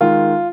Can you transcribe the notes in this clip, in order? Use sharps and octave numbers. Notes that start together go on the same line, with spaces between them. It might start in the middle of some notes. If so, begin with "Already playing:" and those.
D#3 G#3 F4